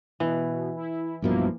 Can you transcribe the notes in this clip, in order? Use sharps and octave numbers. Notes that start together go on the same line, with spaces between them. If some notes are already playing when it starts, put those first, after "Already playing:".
B2 E3
E4
B1 G2 B2 F3 A#3 E4